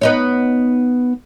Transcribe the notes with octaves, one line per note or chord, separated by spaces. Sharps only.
B3 D#4 C#5